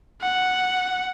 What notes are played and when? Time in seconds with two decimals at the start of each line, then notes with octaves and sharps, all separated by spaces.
0.22 F#5